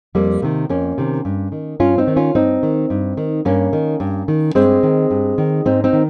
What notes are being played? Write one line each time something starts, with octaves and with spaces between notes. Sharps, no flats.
F2 G3 A#3
C3 D#3
F2 A#3 C#4
C3 D#3
G2
D#3
G2 C#4 F4
C4 D#4
D#3
C#4 F4
G2 C4 D#4
D#3
G2
D#3
G2 A#3 C#4
D#3
G2
D#3
G2 G#3 C4
D#3
G2
D#3
G#2 C4 D#4
C4 D#4
D#3